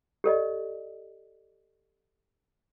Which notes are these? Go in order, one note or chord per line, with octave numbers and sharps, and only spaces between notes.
G4 A4 D5 D#5